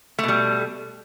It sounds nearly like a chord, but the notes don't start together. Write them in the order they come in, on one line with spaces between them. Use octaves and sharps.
A3 B2 G3